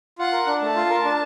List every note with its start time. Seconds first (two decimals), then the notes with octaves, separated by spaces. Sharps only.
0.19 F4 F#5
0.32 A#4
0.47 D4
0.61 A3 A5
0.76 F4
0.90 A#4
1.05 D4